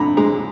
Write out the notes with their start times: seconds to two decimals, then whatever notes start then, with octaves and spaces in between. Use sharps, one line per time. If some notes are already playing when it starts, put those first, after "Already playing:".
Already playing: F2 D3 A#5 B5
0.17 G#3 A#5